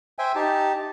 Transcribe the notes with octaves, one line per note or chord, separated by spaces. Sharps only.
C5 E5 G5 G#5
D#4 G4 A5